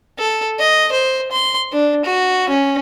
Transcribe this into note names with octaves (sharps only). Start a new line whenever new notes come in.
A4
D#5
C5
C6
D4
F#4
C#4